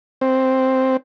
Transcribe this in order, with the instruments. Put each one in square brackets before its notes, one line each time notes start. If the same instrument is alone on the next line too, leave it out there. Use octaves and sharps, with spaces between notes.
[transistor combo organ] C4